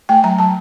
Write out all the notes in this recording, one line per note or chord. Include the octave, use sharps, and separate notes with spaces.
A3 G5
F#3 A#5
F#3 A5